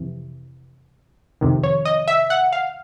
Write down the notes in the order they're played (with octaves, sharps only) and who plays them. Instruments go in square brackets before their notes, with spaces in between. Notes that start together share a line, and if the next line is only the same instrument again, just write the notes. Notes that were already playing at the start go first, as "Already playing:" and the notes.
Already playing: [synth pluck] F2 C3 E3
F2 C3 D#3
C#5
D#5
E5
F#5
F5